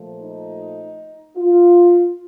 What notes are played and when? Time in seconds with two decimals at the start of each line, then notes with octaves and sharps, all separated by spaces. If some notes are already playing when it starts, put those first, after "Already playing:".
Already playing: A#2 F3 A3
0.21 D#4
1.36 F4